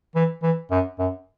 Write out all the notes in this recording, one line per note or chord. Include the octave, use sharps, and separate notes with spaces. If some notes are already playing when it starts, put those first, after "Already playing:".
E3
E3
F#2
F#2